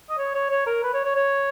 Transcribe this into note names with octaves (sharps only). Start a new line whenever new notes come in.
D#5
C#5
C#5
C#5
A#4
B4
C#5
C#5
C#5